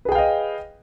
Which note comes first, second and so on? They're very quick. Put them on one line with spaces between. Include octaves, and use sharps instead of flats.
B4 G#4 G5 F5 D#5